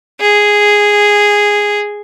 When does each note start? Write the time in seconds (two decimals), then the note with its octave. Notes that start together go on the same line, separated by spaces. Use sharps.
0.20 G#4